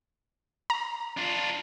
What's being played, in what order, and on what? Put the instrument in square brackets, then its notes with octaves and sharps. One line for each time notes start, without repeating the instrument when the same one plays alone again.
[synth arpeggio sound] A#5
[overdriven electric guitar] D4 F4